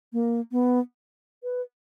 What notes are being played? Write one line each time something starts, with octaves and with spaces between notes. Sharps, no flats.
A#3
B3
B4